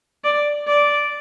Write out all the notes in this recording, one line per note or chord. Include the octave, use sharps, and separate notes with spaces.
D5
D5